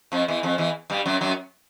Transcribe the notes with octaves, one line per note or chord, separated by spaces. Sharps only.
F2 F3
E2 E3
F2 F3
E2 E3
G2 G3
F#2 F#3
F#2 F#3